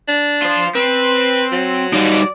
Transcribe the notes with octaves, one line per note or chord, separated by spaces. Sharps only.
D4
F4 C5
C4 B4
F#3
G3 D#4 D5